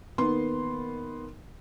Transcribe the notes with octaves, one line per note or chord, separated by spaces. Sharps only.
D#3 A#3 B3 C6